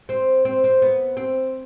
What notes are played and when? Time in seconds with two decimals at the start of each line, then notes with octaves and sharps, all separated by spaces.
0.09 C4
0.45 C4
0.64 C4
0.82 B3
1.17 C4